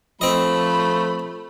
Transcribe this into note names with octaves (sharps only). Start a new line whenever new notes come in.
F3 A3 C4 D#5 B5